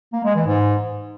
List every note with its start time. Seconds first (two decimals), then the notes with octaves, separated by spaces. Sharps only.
0.13 A#3
0.24 G#3
0.35 E3
0.46 G#2